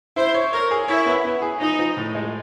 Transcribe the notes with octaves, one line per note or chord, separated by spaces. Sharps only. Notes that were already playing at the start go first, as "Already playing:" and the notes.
E4 C5
C#5
A#4 C#5
G#4
E4 C#5
B3
B3
G#4
F3 D#4
F3
A2
G#3